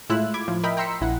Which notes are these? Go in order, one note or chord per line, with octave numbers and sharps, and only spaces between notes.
A2 G#3 E4 F4 E6 F#6
B5 D6 G#6
A2 F3
A#4 D#5 E5 G5 B5
G5 A#5 C6 E6 B6 C#7
A#1 E4 F#5